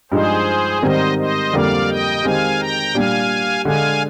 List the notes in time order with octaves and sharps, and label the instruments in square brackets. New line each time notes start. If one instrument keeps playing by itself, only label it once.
[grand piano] G2 F3 G#3 D#4 [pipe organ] G#4 C5
[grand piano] G#2 D#3 G3 C4 [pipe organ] C5 D#5
[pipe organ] C5 D#5
[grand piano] F2 D3 G3 A#3 [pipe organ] D5 F5
[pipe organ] D#5 G5
[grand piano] D#3 G#3 C4 G4 [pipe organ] F5 G#5
[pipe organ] G5 A#5
[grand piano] A#2 G3 D4 G4 [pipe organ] F5 G#5
[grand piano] D3 G#3 D4 [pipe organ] F5 G#5